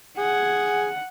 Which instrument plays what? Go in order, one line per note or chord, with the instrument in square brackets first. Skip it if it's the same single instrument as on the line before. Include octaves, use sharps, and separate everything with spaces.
[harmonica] G#4 [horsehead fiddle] F#5